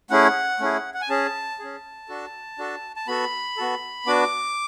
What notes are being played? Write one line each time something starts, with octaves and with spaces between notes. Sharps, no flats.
A3 C#4 E4 G#4 F#5
A3 C#4 E4 G#4
F#5
G#5
C#4 G#4 A5
C#4 G#4
D4 F#4 A4
D4 F#4 A4
A5
B3 F#4 A4 B5
B3 F#4 A4
B3 D4 F#4 D6